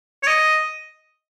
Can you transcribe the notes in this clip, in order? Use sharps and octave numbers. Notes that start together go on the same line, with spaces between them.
C#5
D#5